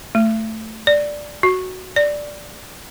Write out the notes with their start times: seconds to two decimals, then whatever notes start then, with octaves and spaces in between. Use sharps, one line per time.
0.15 A3
0.87 D5
1.43 F#4
1.96 D5